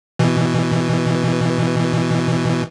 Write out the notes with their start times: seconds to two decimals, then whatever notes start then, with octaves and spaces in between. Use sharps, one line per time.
0.19 B2 E3